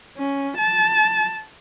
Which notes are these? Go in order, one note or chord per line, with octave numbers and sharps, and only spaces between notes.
C#4
A5